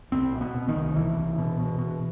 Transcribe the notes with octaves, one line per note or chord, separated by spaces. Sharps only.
C2 C4
B2
B3
B2
D#3
C2
C2 E3
C2
B2
B2
B2